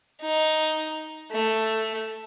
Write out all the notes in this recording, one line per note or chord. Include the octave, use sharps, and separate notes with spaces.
D#4
A3